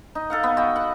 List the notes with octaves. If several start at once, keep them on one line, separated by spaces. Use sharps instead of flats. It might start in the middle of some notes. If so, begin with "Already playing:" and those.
D#4
A4 F5 F#5
B3
F#4 D#5 G5
F#5